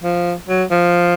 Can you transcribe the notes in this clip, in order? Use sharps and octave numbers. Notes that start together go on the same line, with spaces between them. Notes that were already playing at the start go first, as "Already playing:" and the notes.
F3
F#3
F3